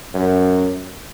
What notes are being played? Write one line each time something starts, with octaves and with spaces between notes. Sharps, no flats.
F#2